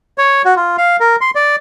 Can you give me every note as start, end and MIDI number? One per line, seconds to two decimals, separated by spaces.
0.18 0.42 73
0.45 0.55 66
0.56 0.76 65
0.78 0.96 77
1.00 1.16 70
1.21 1.30 84
1.35 1.56 74